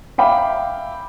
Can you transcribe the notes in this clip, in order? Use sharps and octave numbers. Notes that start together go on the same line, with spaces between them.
E5 F5 G5 B5 D6